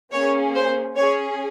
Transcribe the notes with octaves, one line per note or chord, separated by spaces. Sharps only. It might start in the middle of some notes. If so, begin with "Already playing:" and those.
A#3 C#4 G#4 C#5
C5
C#4 G#4 C#5